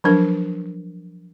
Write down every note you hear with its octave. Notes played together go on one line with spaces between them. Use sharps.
F3 F#3 D4 A#4